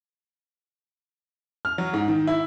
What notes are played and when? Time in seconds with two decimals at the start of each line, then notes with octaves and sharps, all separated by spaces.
1.65 F6
1.78 F#3
1.94 G#2
2.08 D#3
2.27 E4